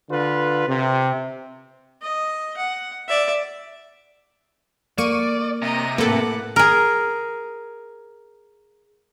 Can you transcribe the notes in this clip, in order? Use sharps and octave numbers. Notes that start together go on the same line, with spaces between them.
D3 F4 B4
C3
D#5
F#5
D5 E5
A#3 D5 C#6 D#7
C3 D#5 A#5
A2 A#3 A4 B4 F#5 D6
G#4 A#4